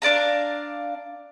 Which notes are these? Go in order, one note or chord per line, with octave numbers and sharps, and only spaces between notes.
D4 D5 F5 A#5